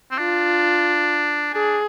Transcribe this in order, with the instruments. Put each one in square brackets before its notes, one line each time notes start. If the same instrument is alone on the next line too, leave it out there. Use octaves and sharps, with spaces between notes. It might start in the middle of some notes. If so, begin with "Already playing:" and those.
[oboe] C4
[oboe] D4 [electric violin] F4
[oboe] D4 [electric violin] G#4